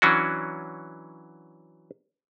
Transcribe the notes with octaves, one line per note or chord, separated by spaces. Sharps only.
E3 F#3 C#4 D4 F#4